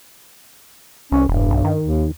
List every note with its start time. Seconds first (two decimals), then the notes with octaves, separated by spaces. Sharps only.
1.12 C2 C#4
1.29 E1 G2
1.51 B1
1.64 D#3
1.83 D#2